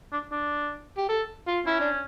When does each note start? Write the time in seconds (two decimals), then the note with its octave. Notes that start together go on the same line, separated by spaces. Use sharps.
0.12 D4
0.31 D4
0.97 G4
1.09 A4
1.47 F4
1.66 C#4 E4
1.80 D4